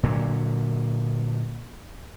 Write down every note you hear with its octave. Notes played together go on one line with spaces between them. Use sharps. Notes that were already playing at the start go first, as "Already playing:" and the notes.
A#2 D3 F#3